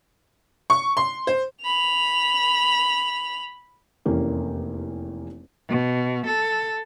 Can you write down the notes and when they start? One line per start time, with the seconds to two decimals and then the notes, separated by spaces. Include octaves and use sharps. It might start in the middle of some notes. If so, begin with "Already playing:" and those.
0.70 C#6
0.97 C6
1.27 C5
1.63 B5 F7
4.05 F1 E2 A#3 C#4 G4
5.69 B2
6.27 A4